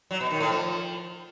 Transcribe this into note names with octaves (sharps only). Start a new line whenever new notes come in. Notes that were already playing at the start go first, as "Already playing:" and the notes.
F#3
B2
D#3
A2
F3